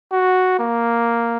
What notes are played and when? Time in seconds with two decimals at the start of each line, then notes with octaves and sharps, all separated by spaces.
0.12 F#4
0.59 A#3